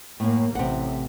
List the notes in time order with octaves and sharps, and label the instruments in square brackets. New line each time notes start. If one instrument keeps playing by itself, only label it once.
[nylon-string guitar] F#2 A2 [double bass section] A#3
[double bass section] A1 [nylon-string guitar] C3 F#5